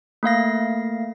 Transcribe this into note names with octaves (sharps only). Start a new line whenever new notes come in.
A3 A#3 F5 A#6